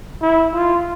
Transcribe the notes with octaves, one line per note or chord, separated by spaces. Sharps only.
E4
F4